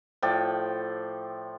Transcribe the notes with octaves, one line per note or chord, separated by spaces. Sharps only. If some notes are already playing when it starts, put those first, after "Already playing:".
A2 F3 D5 G5